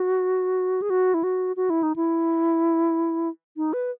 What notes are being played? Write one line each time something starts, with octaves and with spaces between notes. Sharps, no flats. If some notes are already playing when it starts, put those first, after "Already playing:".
Already playing: F#4
G#4
F#4
E4
F#4
F#4
E4
D#4
E4
D#4
B4